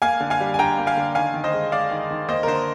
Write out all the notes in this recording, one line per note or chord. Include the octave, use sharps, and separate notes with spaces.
A#3 F5 G#5
D3
F5 G#5
G3
G#5
D3 G5 A#5
A#3
F5 G#5
D3
D#3 F5 G#5
D#3
C5 D#5
G#3
G#3 D5 F5
D#3
D#3
A#3 C5 D#5
A#4
D3 C5